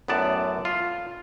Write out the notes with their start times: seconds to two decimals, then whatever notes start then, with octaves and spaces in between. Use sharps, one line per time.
0.08 F#2 A2 B3 D5 A5
0.65 F4